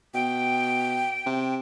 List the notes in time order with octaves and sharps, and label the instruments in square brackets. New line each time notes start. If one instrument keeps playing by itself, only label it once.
[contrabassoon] B2 [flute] G5
[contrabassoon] C3